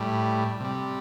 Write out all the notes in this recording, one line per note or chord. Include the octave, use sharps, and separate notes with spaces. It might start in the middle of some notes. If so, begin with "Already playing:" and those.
Already playing: A2 G3
C3 G3